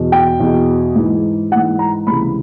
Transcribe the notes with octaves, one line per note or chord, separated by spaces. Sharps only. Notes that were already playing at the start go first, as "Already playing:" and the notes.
Already playing: E2 B2
G5
E2 B2
G#2 E3
G#2 E3 F#5
A#5
C#2 C3 E3 B5